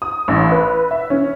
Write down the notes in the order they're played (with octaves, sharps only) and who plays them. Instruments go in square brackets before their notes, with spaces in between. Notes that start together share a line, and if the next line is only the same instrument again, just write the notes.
[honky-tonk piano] D#6
A1
B4
E5
C#4